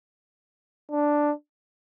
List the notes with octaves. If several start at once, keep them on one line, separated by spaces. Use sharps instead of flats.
D4